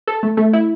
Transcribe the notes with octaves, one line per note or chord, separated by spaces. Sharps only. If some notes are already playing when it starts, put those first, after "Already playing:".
A4
A3
A3
E4